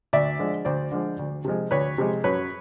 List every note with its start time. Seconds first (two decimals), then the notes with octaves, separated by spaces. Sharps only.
0.13 D2 D5 E5
0.39 D3 F3 G#3
0.65 D2 C5 D5
0.92 D3 F3 G#3
1.19 D2
1.45 C3 F3 G#3
1.71 D2 B4 C#5
1.98 C3 F3 G#3
2.24 F#2 B4 C#5